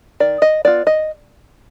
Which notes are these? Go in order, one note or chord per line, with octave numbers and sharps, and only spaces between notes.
D#3 D5
D#5
B3 F4 D5
D#5